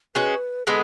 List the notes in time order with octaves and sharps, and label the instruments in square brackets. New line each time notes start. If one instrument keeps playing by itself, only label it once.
[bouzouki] G#3 C#4 F#4 [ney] B4
[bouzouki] D3 G#3 B3 [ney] A4